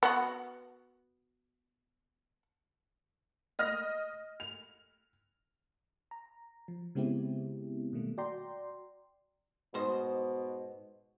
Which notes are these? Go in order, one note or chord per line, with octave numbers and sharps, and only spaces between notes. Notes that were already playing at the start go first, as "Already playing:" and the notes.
B3 F#4
D#5 F6 A#6
F7
A#5
F3
C#3 G#3 B3 C4 E4 G4
B2 D#3 G3 A3 A#3
F#4 D5 G5 A#5 C6
G#2 B2 C5 D#5